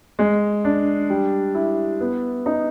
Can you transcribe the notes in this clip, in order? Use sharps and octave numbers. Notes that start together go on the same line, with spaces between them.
G#3
D4
G3
E4
B3
D#4